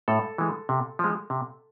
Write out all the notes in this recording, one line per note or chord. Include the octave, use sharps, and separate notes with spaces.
A2 A4
E3 G#3
C3
F3 G#3
C3